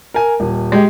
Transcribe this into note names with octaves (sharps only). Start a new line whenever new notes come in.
A#4 G#5
D#1
G#3 G4